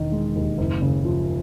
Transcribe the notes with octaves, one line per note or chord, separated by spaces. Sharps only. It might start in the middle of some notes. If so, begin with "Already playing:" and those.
Already playing: E1 D#3
G#3
D#2
F#1
C#3
F3